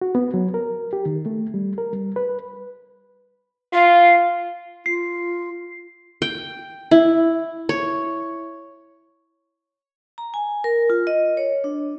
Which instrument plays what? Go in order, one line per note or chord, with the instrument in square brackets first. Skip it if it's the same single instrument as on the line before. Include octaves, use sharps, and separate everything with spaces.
[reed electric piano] F#4
B3
F#3
A#4
G4
D#3
A3
G3
A#4
G3
B4
[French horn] F4 [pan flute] F5
[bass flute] F4 [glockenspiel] C7
[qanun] G5
E4
C#5
[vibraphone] A#5
G#5
A#4
F4
D#5
C#5
D4